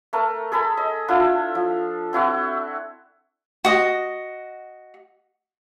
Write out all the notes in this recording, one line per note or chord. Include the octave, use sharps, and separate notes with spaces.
A3 A#4 A5
G#4 A4 B5
D#5
D4 E4 F4 A4
F3
C4 E4 F#4 F#5
F#4 D#5